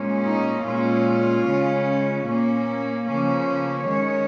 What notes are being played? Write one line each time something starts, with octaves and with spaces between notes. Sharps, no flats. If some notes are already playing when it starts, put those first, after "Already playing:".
Already playing: A#2 G#3 C#4
D#4
A#2 G#3 C#4 F4
C#3 G#3 C#4
A#2 A#3 C#4
C#3 F3 A#3 C#4
D#3 G#3 C#4 C#5